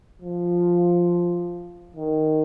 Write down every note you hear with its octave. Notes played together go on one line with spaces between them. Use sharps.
F3
D#3